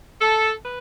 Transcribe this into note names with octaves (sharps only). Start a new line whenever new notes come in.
A4
B4